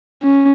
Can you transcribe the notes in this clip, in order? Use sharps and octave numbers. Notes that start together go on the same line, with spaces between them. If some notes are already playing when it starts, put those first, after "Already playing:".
C#4